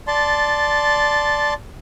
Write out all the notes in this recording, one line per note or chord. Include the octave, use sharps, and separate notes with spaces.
D5 A5 C6